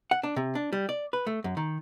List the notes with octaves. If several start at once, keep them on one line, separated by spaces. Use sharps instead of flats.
F#5
D4
C3
D4
G3
D5
B4
A3
F#2
D#3